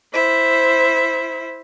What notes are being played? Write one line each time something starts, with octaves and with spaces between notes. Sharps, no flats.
E4 C5 E5